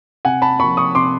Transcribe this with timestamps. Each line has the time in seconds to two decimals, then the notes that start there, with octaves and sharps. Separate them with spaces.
0.25 C3 F#5 G#5
0.42 A5 B5
0.60 F3 A#3 B5 C#6
0.77 C#6 D#6
0.95 C3 C6 D6